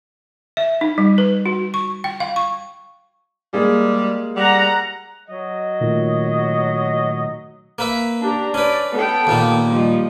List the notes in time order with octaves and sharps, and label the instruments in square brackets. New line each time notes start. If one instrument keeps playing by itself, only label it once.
[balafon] E5
D#4
G3
B4
F#4
C#6
G5
F5
C#6
[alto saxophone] G3 [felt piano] G#3 A#3 G#4
[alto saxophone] G3 [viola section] F#5 A#5
[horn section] F#3 D#5
[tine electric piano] A#2 D#3 A3
[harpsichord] A#3 B4 E5
[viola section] D4 G4 A#5
[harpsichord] C#4 B4 [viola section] D5
[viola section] B3 A4 G5
[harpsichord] D#2 A#2 A#3
[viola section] F3 G3 D#5